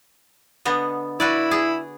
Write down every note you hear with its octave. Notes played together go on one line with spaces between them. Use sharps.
D3 B3 D#5
E4 F#4 B4 D5
G#4